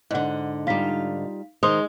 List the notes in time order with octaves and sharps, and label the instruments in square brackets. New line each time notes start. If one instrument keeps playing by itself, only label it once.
[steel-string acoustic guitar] G#2 D3 [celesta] D#5 F#5
[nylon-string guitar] G3 D#4 F4 [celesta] F5 B6
[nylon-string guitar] D#3 C5 [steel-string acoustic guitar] G#3 [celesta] C6 D#6 F7